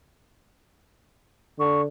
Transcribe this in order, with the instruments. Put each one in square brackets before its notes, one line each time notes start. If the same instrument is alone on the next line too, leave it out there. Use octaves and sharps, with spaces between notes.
[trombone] D3 [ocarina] C#6